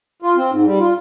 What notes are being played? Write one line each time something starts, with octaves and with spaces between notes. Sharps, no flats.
F4
C4
G#2
G3
F4